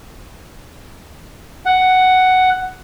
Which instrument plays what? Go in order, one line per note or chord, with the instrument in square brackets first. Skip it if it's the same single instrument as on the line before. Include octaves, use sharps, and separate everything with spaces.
[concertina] F#5